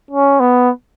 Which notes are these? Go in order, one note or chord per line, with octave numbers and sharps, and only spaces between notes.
C#4
B3